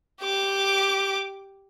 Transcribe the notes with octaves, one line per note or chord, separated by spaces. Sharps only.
G4 D6